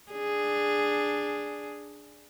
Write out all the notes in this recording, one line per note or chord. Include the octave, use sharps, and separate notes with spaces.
D4 G#4